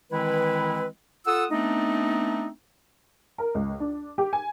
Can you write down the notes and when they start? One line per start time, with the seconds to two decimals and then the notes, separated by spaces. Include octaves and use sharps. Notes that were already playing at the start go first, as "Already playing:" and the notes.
0.11 D#3 E3 G#3 C4 E4 B4
1.26 F4 A4 F#5 D#6 E6
1.51 A3 B3 C4 D4 D#4
3.38 A#4
3.55 C#2
3.80 D4
4.18 G4
4.33 G#5